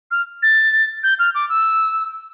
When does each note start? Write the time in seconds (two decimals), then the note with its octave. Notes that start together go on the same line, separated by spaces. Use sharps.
0.11 F6
0.43 A6
1.03 G6
1.19 F6
1.35 D6
1.49 E6